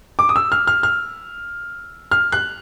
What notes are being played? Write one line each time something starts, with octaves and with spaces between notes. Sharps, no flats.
D6
D#6
E6
F6
F6
F6
F6
F#6